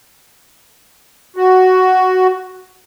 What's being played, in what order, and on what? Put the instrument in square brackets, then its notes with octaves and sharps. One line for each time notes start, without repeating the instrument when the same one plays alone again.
[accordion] F#4